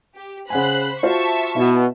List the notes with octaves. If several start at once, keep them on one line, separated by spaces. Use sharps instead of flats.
G4
C#3 C5 F#5 G#5 B5 F#6
F4 F#4 C5 E5 A5 C#6
B2 E4